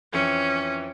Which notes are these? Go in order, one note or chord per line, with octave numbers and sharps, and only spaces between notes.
F2 E3 C#4 C#7